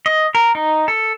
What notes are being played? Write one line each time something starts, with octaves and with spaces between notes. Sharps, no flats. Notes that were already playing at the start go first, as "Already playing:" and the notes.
D#5
A#4
D#4
A4